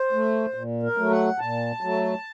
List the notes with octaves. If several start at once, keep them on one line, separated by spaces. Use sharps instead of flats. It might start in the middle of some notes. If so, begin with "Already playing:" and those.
Already playing: C5
A3
A#2
A#4
F#3 A3
F#5
A#2 A5
F#3 A3